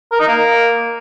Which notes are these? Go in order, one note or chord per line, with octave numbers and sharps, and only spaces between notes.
A#4
D#4
A#3